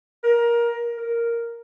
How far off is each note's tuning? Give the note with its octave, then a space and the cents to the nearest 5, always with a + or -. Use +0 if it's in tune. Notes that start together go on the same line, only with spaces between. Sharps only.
A#4 +20
A#4 +0